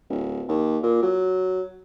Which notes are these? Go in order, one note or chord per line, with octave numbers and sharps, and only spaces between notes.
D1
D#2
A#2
F#3